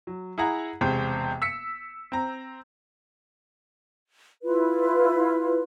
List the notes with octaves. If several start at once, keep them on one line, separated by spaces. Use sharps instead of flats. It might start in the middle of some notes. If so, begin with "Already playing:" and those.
F#3
E4 G#4 F#5 A#5
E1 C3 G#3 C5 G5
E6 B6 C#7
C4 A#5
E4 F4 B4